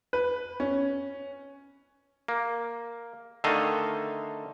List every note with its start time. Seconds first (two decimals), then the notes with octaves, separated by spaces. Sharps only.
0.13 B4
0.60 C#4
2.28 A#3
3.44 D3 D#3 A3 A4 D#5 F5